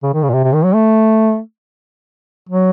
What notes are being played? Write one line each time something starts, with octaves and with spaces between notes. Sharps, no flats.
C#3
D#3
C#3
A#2
C3
C3
D#3
F#3
A3
F#3